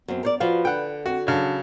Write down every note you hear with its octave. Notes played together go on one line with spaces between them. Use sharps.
F#2 B3 C4
A#4 C5 D5
F3 F#4 B4 F5
D3 F#5 G5
C4 F#4
C#3 F#3 D4